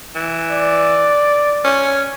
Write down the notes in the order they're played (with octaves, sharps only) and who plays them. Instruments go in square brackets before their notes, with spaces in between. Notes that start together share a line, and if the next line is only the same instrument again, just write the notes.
[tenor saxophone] E3
[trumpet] D5
[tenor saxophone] C#4